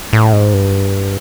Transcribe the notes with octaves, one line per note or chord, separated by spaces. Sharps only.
A2
G#2
G2